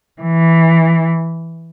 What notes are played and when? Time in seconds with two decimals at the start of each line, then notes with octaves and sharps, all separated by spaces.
0.22 E3